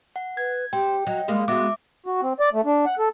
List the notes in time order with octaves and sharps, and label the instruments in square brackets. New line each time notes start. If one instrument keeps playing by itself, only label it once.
[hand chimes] F#5
[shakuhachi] B4 [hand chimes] G#6
[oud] C4 [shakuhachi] G4 [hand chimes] G5
[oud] F#3 [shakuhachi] D#5
[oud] G3 G#3 A#3
[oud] G#3 B3 [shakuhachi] F#4 [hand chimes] E5 D6
[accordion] F#4
C4
D5
A3
D4
F#5
A4